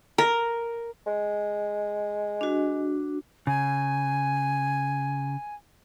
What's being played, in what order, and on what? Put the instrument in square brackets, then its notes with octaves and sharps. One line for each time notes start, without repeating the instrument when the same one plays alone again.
[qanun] A#4
[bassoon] G#3
[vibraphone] D4 F#4
[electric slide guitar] C#3 [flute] G#5